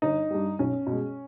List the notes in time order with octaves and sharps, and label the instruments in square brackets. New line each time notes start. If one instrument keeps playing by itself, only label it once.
[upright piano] G1 D#4
G2 G3
B1 C#4
B2 G#3